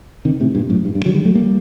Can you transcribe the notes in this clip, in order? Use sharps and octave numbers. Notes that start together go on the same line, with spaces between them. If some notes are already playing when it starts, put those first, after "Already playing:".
C3 D#3
A2 C3
G2 A#2
F#2 A2
G2
G2
D3 F#3
D#3 G3
F#3 A3
G3 A#3